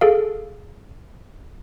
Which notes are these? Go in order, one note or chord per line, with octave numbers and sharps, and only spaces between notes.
G#4 A4 F5